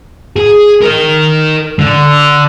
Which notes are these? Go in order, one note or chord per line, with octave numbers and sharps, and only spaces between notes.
G#4
A#4 D#5
D3